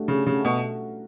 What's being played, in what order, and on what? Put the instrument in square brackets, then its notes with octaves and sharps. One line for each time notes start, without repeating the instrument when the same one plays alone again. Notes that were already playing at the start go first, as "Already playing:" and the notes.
Already playing: [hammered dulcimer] A2 D3 G3 B3 F#4
[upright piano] C#3
[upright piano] C#3 [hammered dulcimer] F#3 A3 C#4 F#4
[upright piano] B2